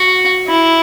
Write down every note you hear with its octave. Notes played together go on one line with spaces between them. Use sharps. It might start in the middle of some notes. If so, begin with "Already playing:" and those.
Already playing: F#4
E4